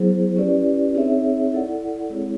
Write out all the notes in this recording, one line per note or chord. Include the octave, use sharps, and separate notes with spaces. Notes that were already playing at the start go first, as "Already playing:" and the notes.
Already playing: F#3 B3 E4 G#4 C5
C#4 E4 G4 B4 D5
C4 D#4 G#4 C#5 E5
E4 A4 D5 F#5
G#3 C4 E4 G#4 C#5